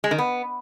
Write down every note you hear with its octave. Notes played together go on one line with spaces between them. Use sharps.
G#3
D#3
B3